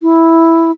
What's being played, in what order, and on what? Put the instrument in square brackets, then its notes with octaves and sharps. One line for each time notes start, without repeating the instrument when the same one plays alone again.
[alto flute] E4